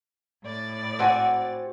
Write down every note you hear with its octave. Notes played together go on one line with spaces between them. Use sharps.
A2 D5 A6
C4 F#4 G#5